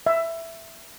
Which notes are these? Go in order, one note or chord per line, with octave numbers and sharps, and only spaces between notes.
E5